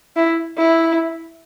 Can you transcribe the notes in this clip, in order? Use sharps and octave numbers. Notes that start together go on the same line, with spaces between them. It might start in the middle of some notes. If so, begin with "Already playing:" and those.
E4
E4